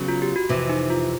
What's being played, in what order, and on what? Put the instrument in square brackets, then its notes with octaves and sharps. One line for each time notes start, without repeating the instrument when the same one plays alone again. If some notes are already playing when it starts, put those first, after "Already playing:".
Already playing: [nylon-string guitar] C#3 F#3 B3
[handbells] F4
G4
F#4
[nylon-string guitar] F2 C3 E3
[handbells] D#4
F4